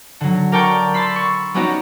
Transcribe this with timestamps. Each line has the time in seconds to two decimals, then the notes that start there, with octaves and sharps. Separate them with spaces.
0.21 D3 F#3
0.52 A#4 D5 G5 A5 C#6 G6
0.94 B5 C6 E6 A6
1.16 C#6
1.54 G3 B3 C#4 D#4 F#4 G4